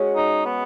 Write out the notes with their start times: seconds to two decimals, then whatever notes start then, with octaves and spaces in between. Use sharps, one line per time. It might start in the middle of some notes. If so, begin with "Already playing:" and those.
Already playing: G#3 C#4 F#4
0.16 D#4
0.46 B3